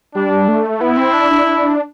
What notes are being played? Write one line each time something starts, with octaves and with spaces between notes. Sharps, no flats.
G3 D4
A3
B3 E4
C4
D4
D4
D4